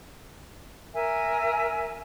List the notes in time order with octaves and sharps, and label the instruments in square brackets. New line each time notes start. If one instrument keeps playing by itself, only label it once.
[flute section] A#4 E5 G#5